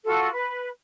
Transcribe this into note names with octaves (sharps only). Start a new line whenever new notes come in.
F4 F#4 A4
B4